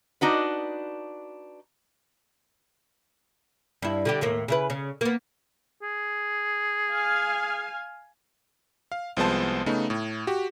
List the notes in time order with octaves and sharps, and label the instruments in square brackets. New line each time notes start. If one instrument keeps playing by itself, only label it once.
[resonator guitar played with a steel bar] D4 D#4 F#4 B4
[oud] G2 E4
D3 G3 G4
D#2 A2 A#3
C#3 E4 B4
C#3
A#3 B3
[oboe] G#4
[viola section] F5 G#5
[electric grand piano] F5
C2 F3 G#3 B3 C5 A5
C#3 A3 B3 D#4
A2
F#4 G4